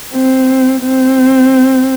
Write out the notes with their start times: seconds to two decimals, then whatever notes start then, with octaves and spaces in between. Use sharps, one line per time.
0.14 C4
0.82 C4